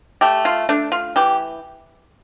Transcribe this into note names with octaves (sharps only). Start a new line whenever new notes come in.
A3 G4
F4
A3 D4
F4
E3 G4